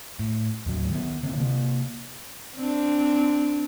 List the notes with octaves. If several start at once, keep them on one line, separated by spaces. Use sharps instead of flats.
A2
D#2 A2 F#3
D#3 B3
D3 D#3 A#3 C4
C3 A#3
C4 D4